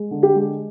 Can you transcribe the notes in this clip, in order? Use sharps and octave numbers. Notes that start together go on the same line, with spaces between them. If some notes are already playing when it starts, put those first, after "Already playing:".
Already playing: G#3
D3
G4
G#3